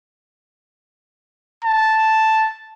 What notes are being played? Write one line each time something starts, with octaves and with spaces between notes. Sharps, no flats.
A5